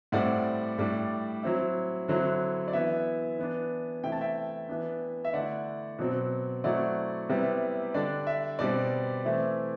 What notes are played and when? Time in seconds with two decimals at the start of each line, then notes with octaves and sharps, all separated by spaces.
0.12 A2 G3 C4 D5 F#5
0.78 A2 G3 D4
1.43 F#3 C4 E4
2.08 D3 F#3 C4 E4
2.68 D5
2.73 E3 B3 E4 E5
3.39 E3 B3 D4
4.03 C3 E3 A3 E4 G5
4.12 A5
4.21 E5 G5
4.69 E3 B3 D4
5.25 E5
5.34 D3 A3 E4 D5 F#5
5.99 B2 F#3 C4
6.64 F#3 A3 C4 E4 D5 F#5
7.29 C3 G3 B3 E4
7.94 D3 G3 D4 D5
8.27 E5
8.59 B2 G3 C4 D5
9.25 E3 A3 C4 E4